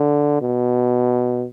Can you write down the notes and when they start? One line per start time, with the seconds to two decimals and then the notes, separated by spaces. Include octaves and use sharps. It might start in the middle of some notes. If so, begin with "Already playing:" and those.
Already playing: D3
0.42 B2